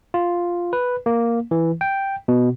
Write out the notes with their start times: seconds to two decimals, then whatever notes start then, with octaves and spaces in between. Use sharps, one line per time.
0.14 F4
0.73 B4
1.06 A#3
1.51 E3
1.81 G5
2.28 B2